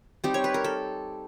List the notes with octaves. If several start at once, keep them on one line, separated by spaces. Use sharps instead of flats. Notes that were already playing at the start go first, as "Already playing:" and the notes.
G3 C4 D#4 G4
C#5
B4
A#4
A4